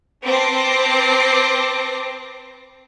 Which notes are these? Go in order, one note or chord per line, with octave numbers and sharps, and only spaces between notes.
C4 B4 A5 D6 A#6 C7